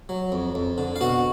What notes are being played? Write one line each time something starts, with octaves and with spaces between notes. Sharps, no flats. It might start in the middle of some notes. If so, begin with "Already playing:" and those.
F#3
F2
F2
D3
F5
B2 F#4 F#5